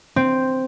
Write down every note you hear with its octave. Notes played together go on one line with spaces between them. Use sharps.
C4